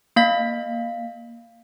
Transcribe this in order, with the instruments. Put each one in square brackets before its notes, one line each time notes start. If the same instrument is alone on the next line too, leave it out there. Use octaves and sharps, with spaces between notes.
[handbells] A#3 F5 B6